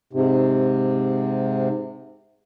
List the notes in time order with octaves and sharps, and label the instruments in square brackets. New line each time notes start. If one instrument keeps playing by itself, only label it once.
[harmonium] G#2 C3